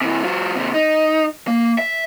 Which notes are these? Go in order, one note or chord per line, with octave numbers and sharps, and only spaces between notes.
C3 E3
F#3 F4
D#2 C3
D#4
A#3
E5